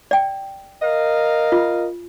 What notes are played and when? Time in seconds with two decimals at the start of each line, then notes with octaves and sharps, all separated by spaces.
0.11 D5 G5
0.83 A#4 D#5 F5
1.52 F4